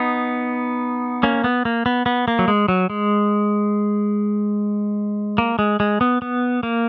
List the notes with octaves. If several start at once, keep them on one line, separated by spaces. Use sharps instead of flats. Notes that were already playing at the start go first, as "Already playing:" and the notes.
Already playing: B3 D#4
A#3 C#4
B3
A#3
B3
B3
A#3
F#3
G#3
F#3
G#3
A#3
G#3
G#3
B3
B3
A#3